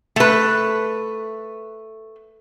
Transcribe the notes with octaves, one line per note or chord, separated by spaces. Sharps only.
A3 B4